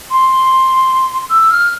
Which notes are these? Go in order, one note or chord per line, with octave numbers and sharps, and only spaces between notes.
C6
E6
F6